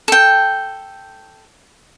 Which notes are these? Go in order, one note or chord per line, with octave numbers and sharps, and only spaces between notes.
A4 G5